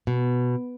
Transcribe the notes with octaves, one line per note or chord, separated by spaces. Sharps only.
B2